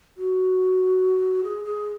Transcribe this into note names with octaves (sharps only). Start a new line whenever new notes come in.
F#4
G#4
G#4